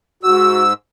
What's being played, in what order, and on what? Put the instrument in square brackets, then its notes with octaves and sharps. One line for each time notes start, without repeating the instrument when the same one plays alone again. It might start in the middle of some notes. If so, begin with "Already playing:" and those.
[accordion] G#2 E6 [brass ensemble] F#4